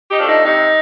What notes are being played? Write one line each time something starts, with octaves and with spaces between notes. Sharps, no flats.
D#4 G4
F3 A3 D4
D#4
C3 D#4